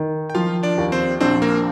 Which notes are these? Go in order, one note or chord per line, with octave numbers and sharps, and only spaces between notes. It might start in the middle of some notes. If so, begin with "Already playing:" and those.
Already playing: D#3
G5
F3 F4 F5
D4 D5
D#2
C4 C5
A#1 C4 C5
A#3 A#4